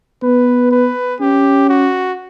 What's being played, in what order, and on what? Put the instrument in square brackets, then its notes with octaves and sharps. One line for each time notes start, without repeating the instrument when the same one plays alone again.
[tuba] B3 [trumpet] B4
[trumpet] B4
[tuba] C#4 [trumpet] G4
[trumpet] F#4